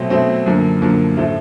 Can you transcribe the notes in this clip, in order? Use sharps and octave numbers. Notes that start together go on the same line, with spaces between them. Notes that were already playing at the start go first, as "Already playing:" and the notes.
Already playing: B2 F#3 A3 C4
B2 F#3 A3 C4
F#2 D3 F3 A#3
F#2 D3 F3 A#3
A2 F3 A3